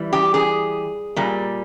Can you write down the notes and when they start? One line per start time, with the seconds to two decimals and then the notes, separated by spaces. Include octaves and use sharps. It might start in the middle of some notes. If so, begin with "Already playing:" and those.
Already playing: E3 G3
0.13 G4
0.34 G#4
1.16 A#2 G3